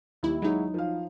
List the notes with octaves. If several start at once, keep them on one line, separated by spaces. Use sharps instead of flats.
D#2 D#3 G3 E4
F#3 G#3 D#4 E4 F#4
F3 F5